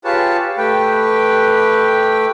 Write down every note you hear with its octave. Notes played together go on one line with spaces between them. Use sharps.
F4 G4 G#4 B4 C#5 A5
A3 G4 B4 G5